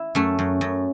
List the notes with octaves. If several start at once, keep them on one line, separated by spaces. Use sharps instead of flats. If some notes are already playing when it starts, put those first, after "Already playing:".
Already playing: E4
F#2 A3
F#2
F#2